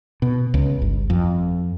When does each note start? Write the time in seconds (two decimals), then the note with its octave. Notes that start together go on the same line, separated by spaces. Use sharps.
0.22 B2
0.54 C#2
0.82 G1
1.10 F2